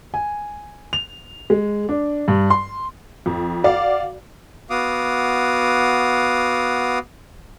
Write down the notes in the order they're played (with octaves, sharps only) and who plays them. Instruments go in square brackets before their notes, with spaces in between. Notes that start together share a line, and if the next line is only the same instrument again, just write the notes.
[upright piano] G#5
F7
G#3
D4
G2
C6
[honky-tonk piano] F2
F#4 D5 F5
[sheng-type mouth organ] B3 F#4 F5 D6 D#6